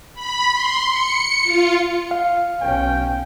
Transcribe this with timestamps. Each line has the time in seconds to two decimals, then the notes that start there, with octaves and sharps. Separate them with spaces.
0.15 B5
0.52 C6
0.88 C#7
1.44 F4
2.11 F5
2.61 B1 C#4 G5